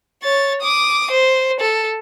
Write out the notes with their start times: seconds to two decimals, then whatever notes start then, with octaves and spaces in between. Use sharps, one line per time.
0.23 C#5 A6
0.62 D6 D#6
1.11 C5
1.60 A4